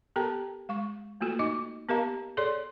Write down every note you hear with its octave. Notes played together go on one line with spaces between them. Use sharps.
B3 G4 A4 A#4 G5 A#5
G#3 F5 C#6
A3 A#3 F4 F#4 A4
D#4 D#5 D6
B3 G4 A#4 D#5 F5 A#5
G#4 A4 C#5 D5 C6